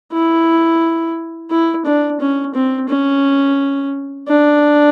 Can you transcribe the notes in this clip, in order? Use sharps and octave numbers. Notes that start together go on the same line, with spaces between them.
E4
E4
D4
C#4
C4
C#4
D4